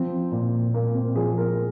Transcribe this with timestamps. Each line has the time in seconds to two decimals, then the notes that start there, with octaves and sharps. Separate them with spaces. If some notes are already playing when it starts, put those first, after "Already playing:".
Already playing: F3 C4
0.32 A#2
0.74 A#2 A#3
0.95 C4
1.16 F3 G#4
1.37 A#4